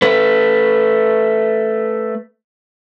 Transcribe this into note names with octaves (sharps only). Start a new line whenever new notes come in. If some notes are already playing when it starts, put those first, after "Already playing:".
A3 B4